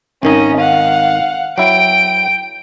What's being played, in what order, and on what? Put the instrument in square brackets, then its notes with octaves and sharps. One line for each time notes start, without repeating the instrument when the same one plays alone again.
[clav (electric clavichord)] G#1 D#3 D#4 [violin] C#4 D#5
[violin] F5 F#5
[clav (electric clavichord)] F#3 E4 [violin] G5 D7